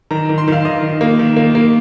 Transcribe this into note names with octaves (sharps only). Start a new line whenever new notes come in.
D#3 A#5
D#3
C6
D#3 F5
D#3 D#5
D#3
A#3
D#3
A#3
A#3